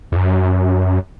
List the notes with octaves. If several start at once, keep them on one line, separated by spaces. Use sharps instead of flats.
E2
F#2